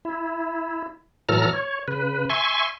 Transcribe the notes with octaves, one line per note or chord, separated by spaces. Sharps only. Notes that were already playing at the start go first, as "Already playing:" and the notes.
E4
A2 E3 F#3 A4 A#5 F6
C#5
C#3 B4
E5 G#5 C6 C#6